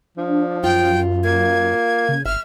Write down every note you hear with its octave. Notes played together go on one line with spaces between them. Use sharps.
F3 D4
F#2 F4 G5
A#3 G#6
C#3
G1 E5 F6